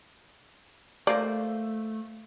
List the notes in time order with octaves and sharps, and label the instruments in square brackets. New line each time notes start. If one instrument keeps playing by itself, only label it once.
[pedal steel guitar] A3 [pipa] A#3 F4 C5 [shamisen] D5